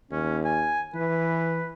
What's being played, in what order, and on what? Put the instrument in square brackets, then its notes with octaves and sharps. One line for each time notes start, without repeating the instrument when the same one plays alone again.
[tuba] D#2 [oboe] C#4
[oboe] G#5
[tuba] E3 [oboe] B4